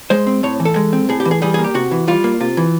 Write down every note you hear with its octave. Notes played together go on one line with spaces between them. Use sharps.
G#3 C5
C4
A2 C#5
E3
A4
G#3
C4
A2 G#4
G4
E3
G#4
G3 G#4
A#3 G#4
G4
C3 F#4
E3
G3 F4
A#3
C3 F4
E3